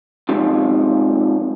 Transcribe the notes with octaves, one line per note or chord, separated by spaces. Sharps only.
F2 G#2 C3